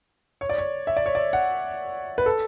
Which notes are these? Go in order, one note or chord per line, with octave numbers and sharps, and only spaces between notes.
C#5
D5
C#5
E5
D5
C#5
D5
F#5
B4
A4